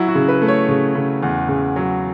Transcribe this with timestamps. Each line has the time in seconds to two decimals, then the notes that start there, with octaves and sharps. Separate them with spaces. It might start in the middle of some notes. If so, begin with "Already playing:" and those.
Already playing: F#3 E4
0.08 F#4
0.15 C#3
0.29 B4
0.42 A3
0.48 C#5
0.68 C#3
0.95 C#3
1.23 E2
1.48 C#3
1.76 F#3